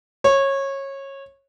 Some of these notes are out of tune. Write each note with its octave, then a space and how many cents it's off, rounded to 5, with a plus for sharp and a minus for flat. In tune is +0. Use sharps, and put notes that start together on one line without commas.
C#5 -20